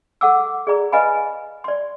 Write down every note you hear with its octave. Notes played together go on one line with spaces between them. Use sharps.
A4 F#5 D6 E6
G#4 D5 A#5
B4 D#5 F5 G#5 B5
D5 C6